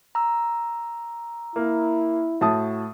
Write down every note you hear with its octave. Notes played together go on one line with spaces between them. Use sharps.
A#5 E6
A#3 E4
A2 F#4 A5 D#6